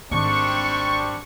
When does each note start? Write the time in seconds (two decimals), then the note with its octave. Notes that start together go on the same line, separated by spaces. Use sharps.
0.11 G#1 D#3 G3 C4 D4 C#6